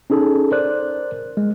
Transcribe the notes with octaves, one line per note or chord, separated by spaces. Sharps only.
C#4 D#4 G#4 A4
A#4 C5 D5 F#6
G#3